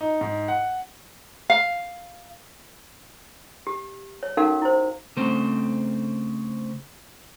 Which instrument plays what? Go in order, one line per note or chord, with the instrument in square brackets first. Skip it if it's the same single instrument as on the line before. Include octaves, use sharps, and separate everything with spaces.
[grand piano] D#4
G#2
F#5
[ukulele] F5
[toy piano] G4
C#5
C#4 D#4 F#4 A4 A#4 F5
E4 C5
[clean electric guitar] C#3 A3 C4 C5